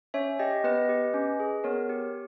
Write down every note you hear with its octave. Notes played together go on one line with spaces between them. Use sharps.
C#4 C#5 E5
G4 D#5 G5
B3 B4 D#5
G4
C#4
G#4
B3 A#4 C#5
G4